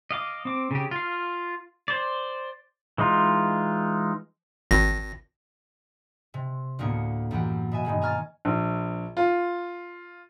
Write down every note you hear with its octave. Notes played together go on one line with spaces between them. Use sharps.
D#5 F5 D6
C4 D6
C#3 G4
F4 F5
C5 D5
E3 G#3 D#4 F4
G#1 A#6
C3
D2 A2 A#3 B3 C#7
F#2 E3 G4 F#5
B2 E5 G#5
G2 B2 D#3 G#3
G#5 A#5 C#6 F6 G#6 A6
A#1
F4